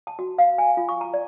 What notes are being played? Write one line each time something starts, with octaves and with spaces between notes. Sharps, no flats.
A5
F#4
F5
G#5
F4
C#6
A#5
D5